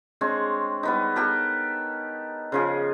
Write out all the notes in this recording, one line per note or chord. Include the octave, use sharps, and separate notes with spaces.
G#3 C4 D4 C#5
G3 B3 D#4
B3 G4 A4 A#4
C#3 F3 G#4